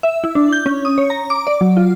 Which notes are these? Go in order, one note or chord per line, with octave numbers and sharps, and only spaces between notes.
E5
E4
D4
G6
C#4
D#6
C#5
A#5
D6
D5
F#3
F4